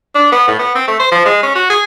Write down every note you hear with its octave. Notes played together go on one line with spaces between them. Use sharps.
D4
B3
A2
B3
C4
A3
C5
F3
G#3
C#4
F#4
G#4